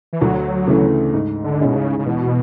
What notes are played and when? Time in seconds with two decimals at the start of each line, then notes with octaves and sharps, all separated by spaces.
0.13 E3
0.21 D2 F#3
0.67 C#3 E3 A3
1.14 G#2
1.44 D3
1.60 G#3 C#4 E4
1.65 B2
1.76 C#3
1.99 C#3
2.06 E2 B2